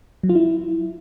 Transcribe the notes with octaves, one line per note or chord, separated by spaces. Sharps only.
F#3
F4
E4